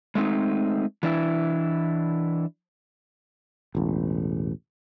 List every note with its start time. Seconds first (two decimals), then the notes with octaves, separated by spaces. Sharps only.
0.15 G#3 A3 C4 D#4
1.03 E3 D4 E4
3.75 E1 A1